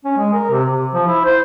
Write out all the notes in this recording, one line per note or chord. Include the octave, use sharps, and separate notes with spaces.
C#4
G#3
A#4
C3
C3
F3
E4
C5